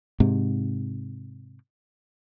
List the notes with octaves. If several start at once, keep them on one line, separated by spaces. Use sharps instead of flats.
G#2 C3